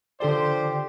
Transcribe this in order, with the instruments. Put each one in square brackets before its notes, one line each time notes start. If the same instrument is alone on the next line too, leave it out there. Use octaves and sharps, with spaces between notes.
[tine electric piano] D3 A4 D5 [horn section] F3 G4 C5